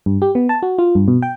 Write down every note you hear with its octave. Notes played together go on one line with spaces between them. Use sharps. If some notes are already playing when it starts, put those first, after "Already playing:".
G2
G4
B3
A5
F#4
F4
G2
B2
G5